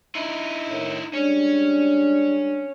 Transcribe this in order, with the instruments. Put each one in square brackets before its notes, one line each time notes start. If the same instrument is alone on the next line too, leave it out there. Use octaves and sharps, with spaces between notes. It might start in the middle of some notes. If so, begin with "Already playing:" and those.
[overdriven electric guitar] D#4 E4
[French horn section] A2 D#3
[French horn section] G3 G#3 D4 [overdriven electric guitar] C#4